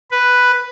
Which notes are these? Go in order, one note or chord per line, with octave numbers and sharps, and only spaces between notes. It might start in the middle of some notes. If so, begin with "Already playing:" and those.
B4